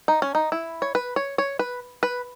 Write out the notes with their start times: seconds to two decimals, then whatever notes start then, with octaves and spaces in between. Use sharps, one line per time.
0.08 D#4
0.22 C#4
0.35 D#4
0.52 E4
0.82 C#5
0.95 B4
1.16 C#5
1.38 C#5
1.59 B4
2.03 B4